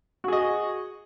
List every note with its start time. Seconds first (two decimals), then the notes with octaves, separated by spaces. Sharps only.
0.24 F#4
0.28 G#4
0.32 D#5